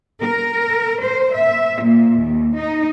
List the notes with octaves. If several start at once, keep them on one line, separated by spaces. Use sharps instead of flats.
A#4
C5
E5
A#2
D#2
D#4